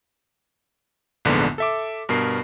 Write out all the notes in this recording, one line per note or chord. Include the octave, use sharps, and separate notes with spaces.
A#1 E2 G#2 D3 B3
A4 E5 D6
G2 B2 A#4 C7